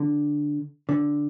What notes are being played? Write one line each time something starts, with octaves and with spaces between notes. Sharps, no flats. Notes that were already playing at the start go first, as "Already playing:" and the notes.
Already playing: D3
D3